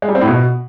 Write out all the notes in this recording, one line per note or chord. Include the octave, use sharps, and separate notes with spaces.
G#3
G3
C4
A2
B2